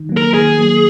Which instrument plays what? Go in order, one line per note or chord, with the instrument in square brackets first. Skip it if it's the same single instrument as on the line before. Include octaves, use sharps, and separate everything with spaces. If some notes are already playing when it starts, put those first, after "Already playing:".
Already playing: [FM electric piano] D#3
F#3 A#3
[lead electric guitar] A#4
[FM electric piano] D#3 [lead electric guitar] G#4
[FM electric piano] F#3 A#3